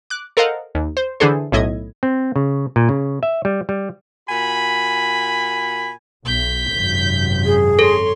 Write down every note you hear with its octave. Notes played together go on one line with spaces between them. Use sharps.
D6 F#6
A4 A#4 C5 D#5 F5 F#5
D#2
C5
D3 E3 D4 G#4 A4 C5
B1 A2 E4 D#5 G#6
C4
C#3
A#2
C#3
E5
G3
G3
A#2 F#4 G#5 B5
B1 G6 B6
G#1 F#2 C3
G#4
A4 C#5 C6